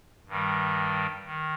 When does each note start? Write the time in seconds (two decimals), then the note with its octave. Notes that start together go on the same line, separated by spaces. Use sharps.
0.27 G2 D#3 G3
1.26 D#3